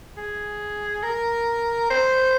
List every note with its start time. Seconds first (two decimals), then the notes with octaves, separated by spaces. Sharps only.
0.17 G#4
1.03 A#4
1.90 C5